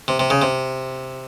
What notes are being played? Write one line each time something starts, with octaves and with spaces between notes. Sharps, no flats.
C3
C3
C#3
C3